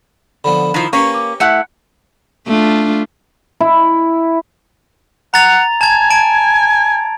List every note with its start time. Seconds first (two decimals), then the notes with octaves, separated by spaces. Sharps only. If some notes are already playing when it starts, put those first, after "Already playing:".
0.44 D3 F3 B3 B5
0.74 D#3 F3 E4
0.93 A#3 C#4 G4 B4 C#5 C#6
1.14 D6
1.40 A3 E4 F#5 F#6 C#7
2.47 A3 D4 F4
3.60 E4
5.34 F#5 A#5 A6 F7
5.81 G#5 A5 G#6
6.10 A5 D7